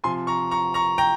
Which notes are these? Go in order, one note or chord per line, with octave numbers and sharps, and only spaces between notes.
C3 F3 G#5 C6
A#5 C#6
A#5 C#6
A#5 C#6
G5 A#5